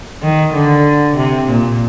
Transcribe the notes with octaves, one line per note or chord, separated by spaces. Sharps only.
D#3
D3
C3
A#2